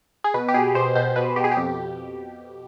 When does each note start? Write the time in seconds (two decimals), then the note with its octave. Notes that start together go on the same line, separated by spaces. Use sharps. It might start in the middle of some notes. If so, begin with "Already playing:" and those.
0.24 G#4
0.34 B2 B4
0.48 G4
0.54 B2 G#4
0.75 B2 C5
0.95 B2 C5
1.16 B2 B4
1.36 B2 G4
1.44 G#4
1.52 G4
1.57 F2